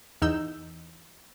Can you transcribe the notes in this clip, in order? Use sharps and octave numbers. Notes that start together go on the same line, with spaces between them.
E2 D#4 E6 G6